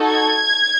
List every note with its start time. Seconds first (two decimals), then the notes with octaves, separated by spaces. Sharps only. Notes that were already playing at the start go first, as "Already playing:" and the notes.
Already playing: D#4 F#4 A4
0.08 G#6